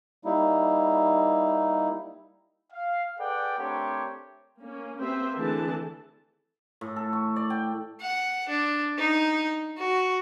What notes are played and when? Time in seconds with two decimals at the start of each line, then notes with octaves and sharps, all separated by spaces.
0.25 G3 A#3 D#4 E4
2.73 F5
3.18 G#4 A4 B4 D5 F#5 G5
3.58 A3 C4 D4 G4 A#4 C#5
4.60 A#3 C#4
5.01 A#3 C4 G4 B4 C5 E5
5.37 D3 E3 A3 C4 G#4 A5
6.81 A2
6.96 A4
7.13 C#6
7.36 D5
7.50 G5
8.01 F#5
8.49 D4
8.98 D#4
9.78 F#4